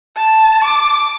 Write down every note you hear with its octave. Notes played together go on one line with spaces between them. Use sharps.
A5
D6